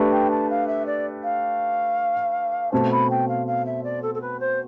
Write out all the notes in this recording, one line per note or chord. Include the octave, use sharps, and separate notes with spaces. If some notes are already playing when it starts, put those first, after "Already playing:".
Already playing: A3 D4 G4 B4
G5
A5
F5
E5
D5
F5
B2 A3 C4 A5
B5
G5
F5
F5
E5
D5
A4
A4
B4
C5